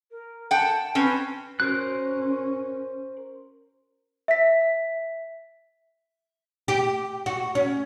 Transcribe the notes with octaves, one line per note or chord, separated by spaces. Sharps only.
A#4
F#5 G5 A5
C4 C#4 B4
C#4 F#4 A#4 C5 F#6
E5 B6
G4
F#4
C#4